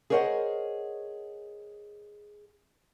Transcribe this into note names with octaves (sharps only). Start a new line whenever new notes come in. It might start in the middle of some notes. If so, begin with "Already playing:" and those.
G#4 A#4 C5 C#5 D#5 F#5